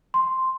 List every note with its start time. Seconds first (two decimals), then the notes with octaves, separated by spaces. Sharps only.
0.14 C6